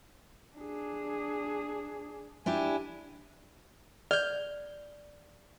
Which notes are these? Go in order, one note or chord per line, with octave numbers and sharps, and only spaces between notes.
D4 G#4
D4 E4 G4 G#5
D5 F6 G6